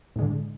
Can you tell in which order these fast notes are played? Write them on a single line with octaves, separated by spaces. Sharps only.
A2 G#3 D3